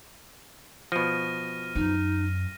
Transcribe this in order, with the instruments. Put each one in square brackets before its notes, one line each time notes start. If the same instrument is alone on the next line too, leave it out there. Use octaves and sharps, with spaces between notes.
[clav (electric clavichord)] B2 F3 [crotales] F6 A#6 D#7
[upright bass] F#2 [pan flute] D#4